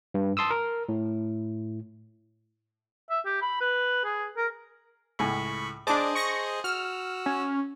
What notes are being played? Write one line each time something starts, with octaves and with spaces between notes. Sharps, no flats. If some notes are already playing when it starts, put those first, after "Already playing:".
G2
A5 C6 D#6 E6
A#4
A2
E5
G4
B5
B4
G#4
A#4
C#2 A2 G#5 B5 C#6
D4 G#4 C5 D#5 A5 D6
C#6 A#6 C#7
F#4 E6 F6
C#4